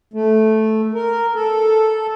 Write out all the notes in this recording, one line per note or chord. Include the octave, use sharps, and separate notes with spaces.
A3
A#4
A4